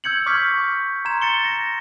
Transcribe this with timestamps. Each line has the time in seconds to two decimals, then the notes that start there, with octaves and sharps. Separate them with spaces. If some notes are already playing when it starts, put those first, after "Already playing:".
0.04 E6 G6 G#6 C#7 F#7
0.26 C#6 D6 F6 G6 G#6 B6
1.05 A#5 C6 G#6 E7
1.22 A6 C#7 G7
1.45 A#6